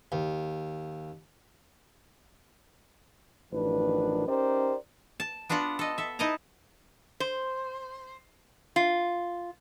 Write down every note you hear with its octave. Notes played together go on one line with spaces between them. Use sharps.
D#2
A1 F#2 D#3 F3 D4 B4
C#4 D#4 G4 A#4 C5 D5
A5
B3 D4 F4 F#4 F#5
A4 D#5
A4 E5
D#4 E4 D#5 A5 A#5
C5
F4